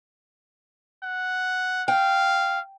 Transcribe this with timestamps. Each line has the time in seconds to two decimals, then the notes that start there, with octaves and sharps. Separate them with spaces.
1.03 F#5
1.88 F5 G5